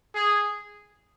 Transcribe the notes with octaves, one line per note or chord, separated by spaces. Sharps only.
G#4